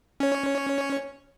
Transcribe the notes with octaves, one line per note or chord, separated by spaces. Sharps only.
C#4 C#5